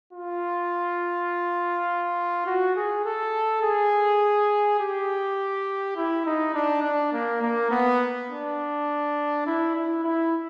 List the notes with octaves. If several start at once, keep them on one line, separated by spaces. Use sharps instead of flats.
F4
F#4
G#4
A4
G#4
G4
E4
D#4
D4
D4
A#3
A#3
B3
D4
E4
E4
E4